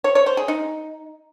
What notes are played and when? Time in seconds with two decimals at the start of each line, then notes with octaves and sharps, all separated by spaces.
0.04 C#5
0.15 C#5
0.26 C5
0.37 G#4
0.48 D#4